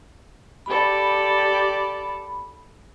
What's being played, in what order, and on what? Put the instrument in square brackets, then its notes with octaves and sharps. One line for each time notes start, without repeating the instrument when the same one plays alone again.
[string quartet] G4 A4 D5 [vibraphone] B5